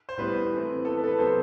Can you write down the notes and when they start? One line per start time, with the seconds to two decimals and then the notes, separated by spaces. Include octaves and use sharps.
0.09 C5
0.18 A2 G3 B3 B4
0.52 E3 A3 C4
0.85 E3 B3 A4
0.97 B4
1.04 A4
1.07 B4
1.19 C3 F#3 B3 A4 C5